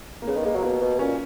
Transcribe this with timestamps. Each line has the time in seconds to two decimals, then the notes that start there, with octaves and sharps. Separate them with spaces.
0.22 A#3
0.27 C#3 B3
0.37 D#3
0.45 G#3 A#3
0.54 F#3
0.64 B2 B3
0.82 B2
0.99 A#2 C#4